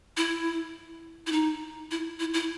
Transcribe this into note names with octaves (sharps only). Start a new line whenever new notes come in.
E4
E4
D#4
E4
E4
E4